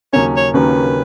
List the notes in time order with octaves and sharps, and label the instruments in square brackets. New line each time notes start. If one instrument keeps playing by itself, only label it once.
[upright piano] D#2 C#3 F#3 A#3 C#4 [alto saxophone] C#5
[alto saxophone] C#5
[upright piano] D#2 C#3 F#3 A#3 C#4 [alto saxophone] B4